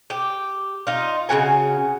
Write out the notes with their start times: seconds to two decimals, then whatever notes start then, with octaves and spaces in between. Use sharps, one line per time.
0.10 G4
0.87 D#4 F4
1.29 C#3 B3 F#4 G#5